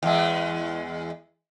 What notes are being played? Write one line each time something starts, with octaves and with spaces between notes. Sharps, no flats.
E2 G#3